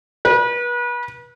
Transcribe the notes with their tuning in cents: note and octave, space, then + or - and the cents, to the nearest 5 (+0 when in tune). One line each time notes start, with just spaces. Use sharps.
B4 -35